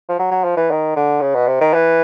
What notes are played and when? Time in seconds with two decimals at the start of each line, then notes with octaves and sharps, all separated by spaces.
0.09 F3
0.20 F#3
0.31 F#3
0.44 F3
0.57 E3
0.71 D#3
0.96 D3
1.21 C#3
1.35 B2
1.47 C3
1.61 D#3
1.74 E3